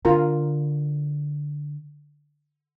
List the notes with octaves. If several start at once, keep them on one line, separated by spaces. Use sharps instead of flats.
D3 F4 A#4 A#5